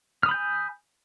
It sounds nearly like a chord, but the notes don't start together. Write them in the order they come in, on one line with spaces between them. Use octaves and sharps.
F6 D#6 B5 G6 G#5